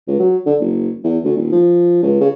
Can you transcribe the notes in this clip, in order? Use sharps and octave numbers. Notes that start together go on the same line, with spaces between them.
C#2
F#3
D3
F#1
E2
D2
D#1
F3
C#2
C#3